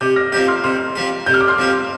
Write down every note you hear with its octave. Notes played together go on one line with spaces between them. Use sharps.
C3 D6 G6
F6 A#6
F3 C4 G4 D6 G6
C6 F6
C3 C6 F6
F3 C4 G4
C3 G6
F6
D6
C6 F6
F3 C4 G4